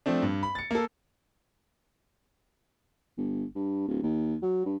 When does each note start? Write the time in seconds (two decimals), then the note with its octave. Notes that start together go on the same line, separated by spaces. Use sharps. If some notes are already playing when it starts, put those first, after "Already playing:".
0.06 F3 A3 C4 D4
0.22 G2
0.43 B5
0.55 A6 C#7
0.71 A#3 A4
3.17 G1
3.55 G2
3.87 D1
4.03 D#2
4.42 F#3
4.65 G2